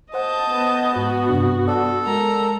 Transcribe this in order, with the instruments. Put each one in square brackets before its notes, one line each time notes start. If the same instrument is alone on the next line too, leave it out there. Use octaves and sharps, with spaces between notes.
[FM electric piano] C5 F#5 [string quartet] D#5 A5 G6
[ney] B3
[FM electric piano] G#2 [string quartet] F#4
[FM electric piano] G2 C3 D4
[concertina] A4 [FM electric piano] D5 F#5
[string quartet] G#3 A#4 A#5